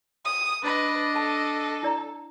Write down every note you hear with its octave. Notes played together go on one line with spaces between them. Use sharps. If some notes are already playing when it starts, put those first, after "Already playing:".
D#6
D4 B4 D#5
A4 A5 B5
E4 D5 A#5